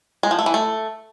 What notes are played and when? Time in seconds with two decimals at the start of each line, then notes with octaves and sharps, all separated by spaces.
0.23 G#3
0.31 F3
0.39 A3
0.46 E3
0.54 A3